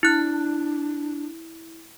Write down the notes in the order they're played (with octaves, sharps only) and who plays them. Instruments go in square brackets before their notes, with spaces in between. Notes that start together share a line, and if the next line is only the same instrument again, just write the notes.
[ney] D4 [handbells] E4 F#6